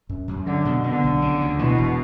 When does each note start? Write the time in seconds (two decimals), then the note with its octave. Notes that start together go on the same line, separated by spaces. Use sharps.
0.09 F#2
0.28 F#2
0.47 D3 F#3
0.65 B2
0.84 D3 B3
1.03 B1
1.22 C#3
1.40 D2
1.59 B2 E3
1.78 E1